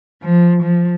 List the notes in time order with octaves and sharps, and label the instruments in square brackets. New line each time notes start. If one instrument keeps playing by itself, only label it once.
[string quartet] F3
F3